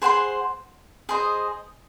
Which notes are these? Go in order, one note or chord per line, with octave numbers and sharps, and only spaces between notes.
G#4 C5 F#5 C6
G#4 C5 D#5